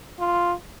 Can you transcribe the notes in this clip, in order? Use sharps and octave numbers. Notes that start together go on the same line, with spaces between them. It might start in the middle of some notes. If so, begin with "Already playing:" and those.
F4